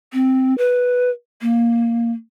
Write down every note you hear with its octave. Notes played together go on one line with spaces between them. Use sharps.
C4
B4
A#3